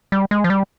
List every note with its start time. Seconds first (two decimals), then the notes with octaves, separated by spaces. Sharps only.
0.12 G3
0.31 G#3
0.44 F3
0.50 G3